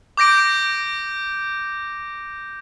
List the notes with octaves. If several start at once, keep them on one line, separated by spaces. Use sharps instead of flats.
D6 G6 A#6 D7